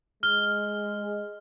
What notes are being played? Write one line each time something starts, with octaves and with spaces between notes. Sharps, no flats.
G#3 F6 G7